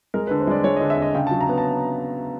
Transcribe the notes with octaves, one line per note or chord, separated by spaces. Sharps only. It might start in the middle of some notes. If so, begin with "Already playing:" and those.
G#3 A#4
B4
D3
C5
G#3 D5
G#3 C#5
D#5
D3
E5
D3 D#5
C#3 G5
A5
F#3
A#5
B3
A5